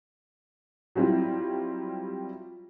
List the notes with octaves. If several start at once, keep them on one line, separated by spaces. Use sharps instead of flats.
F#3 G3 C4 E4 F4